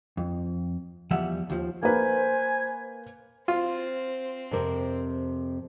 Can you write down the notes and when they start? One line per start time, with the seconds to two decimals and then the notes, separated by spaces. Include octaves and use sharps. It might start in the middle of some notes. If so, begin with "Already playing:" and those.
0.17 F2
1.11 E2 F3 G3 E5 F#5
1.50 D#2 F3
1.83 A#3 B4 C5 G#5
3.48 C4 F4
4.51 F2 C3 A#4